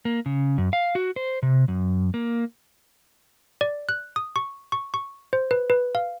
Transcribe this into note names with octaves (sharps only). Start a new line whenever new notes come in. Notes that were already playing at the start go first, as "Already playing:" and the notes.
A#3
C#3
F#2
F5
F#4
C5
C3
F#2
A#3
D5
F#6
D#6
C#6
C#6
C#6
C5
B4
B4
F5